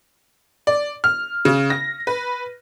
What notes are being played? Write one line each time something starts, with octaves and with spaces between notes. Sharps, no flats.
D5
F6
C#3
A#6
B4